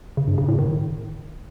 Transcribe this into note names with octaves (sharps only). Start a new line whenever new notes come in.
C#3
G2
C#3
A2
D#3